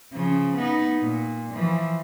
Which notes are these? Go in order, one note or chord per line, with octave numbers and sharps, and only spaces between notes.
C#3 F3
B3 D#4
A#2
E3 F3